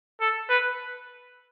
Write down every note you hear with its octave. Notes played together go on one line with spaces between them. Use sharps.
A4
B4